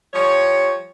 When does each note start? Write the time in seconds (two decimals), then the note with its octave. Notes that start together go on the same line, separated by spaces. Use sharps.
0.14 F3 G3 C#5